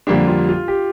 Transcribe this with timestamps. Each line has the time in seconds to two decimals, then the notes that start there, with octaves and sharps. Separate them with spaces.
0.07 F2 D3 G3 A#3 D4 G4
0.27 F4
0.49 F4
0.68 G4